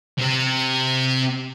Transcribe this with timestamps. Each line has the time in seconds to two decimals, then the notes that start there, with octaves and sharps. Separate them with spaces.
0.18 C3 C4